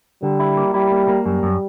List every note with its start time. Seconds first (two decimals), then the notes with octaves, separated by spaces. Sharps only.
0.23 D3 G3
0.40 E4
0.57 A#3
0.74 G3 E4
0.91 A#3
1.08 A#3
1.25 F#2 G3
1.43 F#2